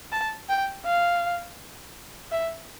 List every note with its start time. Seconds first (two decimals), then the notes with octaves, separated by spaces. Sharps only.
0.12 A5
0.49 G5
0.85 F5
2.31 E5